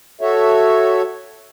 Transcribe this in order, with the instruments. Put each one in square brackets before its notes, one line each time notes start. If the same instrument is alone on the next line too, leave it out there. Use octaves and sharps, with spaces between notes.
[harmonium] F#4 A4 C#5 E5